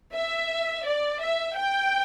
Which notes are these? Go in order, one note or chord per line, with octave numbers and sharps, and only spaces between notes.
E5
D5
E5
G5